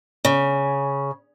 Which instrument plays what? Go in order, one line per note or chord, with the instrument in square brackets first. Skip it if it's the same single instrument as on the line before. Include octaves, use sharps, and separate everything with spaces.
[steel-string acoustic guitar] C#3